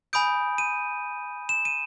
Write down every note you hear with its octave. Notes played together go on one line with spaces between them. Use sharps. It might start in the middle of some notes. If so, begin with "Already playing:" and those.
G#5 B5 D#6 G6 D7
D#7
E7
D#7